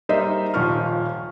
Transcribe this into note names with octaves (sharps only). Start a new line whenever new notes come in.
G3 A#3 D#4 C5 D#5 E5
D#1 F3 C#6 F6